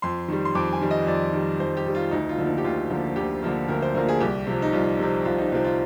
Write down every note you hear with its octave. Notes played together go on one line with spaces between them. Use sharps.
F2 C6
D#3 G3
C6
F2 D6
G#5
D#3 G3
D#5
F2 D5
D#3 G3
F2 C5
G4
D#3 G3
F4
D2 D#4
F4
D3 F3 A#3
D#4
G4
D2 F4
D3 F3 A#3
D2 G4
D3 F3 A#3
D2 A#4
C5
D3 F3 A#3 A#4
G#4
C2 G4
C3 F3 C4
D#4
C2 F4
C3 F3 C4
C2 F4
D#4
C3 F3 C4 F4
F4